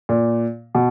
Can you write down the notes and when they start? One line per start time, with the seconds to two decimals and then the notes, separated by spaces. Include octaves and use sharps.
0.09 A#2
0.75 B2